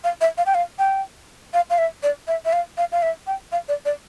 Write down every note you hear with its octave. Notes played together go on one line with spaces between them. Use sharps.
F5
E5
F5
G5
F5
G5
F5
F5
E5
D5
E5
E5
F5
F5
F5
E5
G5
F5
D5
D5